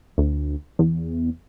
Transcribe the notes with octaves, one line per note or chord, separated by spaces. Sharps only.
D2
E2